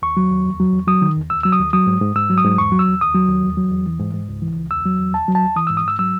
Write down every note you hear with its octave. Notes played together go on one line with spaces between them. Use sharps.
D#2 C#6
F#3
D#2
E2
F#3
E2
F#3 D#6
D#3
E2
D#2 E6
F#3 E6
D#6
D#2
F#3 D#6
G#2
G#2
G#2 E6
F#3
D#6
G#2
E2 C#6
F#3
E6
E2
D#2 D#6
F#3
D#2
E2
F#3
E2
E3
G#2
G#2
C#2
E3
C#2
E2 E6
F#3
E2
D#2 A5
F#3
A5
D#2
E3 D#6
G#2 E6
D#6
G#2 E6
F#3 E6